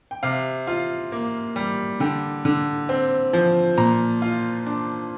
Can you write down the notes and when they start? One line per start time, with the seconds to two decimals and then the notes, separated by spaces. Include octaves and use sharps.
0.11 G5
0.23 C3 F5
0.67 F4
1.12 A#3
1.56 G3
2.00 D3 G5
2.45 D3
2.89 C4
3.33 F3
3.77 A#2 A#5
4.22 F4
4.66 D4